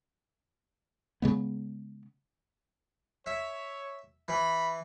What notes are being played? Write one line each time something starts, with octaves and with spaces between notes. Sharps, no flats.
C#3 G#3 B3
C#5 E5
E3 B5